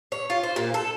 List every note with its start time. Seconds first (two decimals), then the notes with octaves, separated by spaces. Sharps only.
0.12 C#5
0.30 F4
0.43 C5
0.56 A#2
0.74 A4